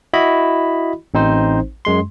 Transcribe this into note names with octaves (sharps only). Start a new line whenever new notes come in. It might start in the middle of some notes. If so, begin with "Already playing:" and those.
E4 F#4 D#5 B5
A1 C4 D#4 C5
F#2 G#3 C6